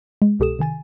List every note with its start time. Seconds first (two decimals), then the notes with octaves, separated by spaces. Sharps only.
0.22 G#3
0.39 C2 B2 G4 A4 D#6 E7
0.59 C3 D#3 G#5 A6